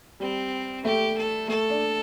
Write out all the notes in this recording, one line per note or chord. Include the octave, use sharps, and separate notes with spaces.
G3 C4
A3 G4
A4
A3 A4
D4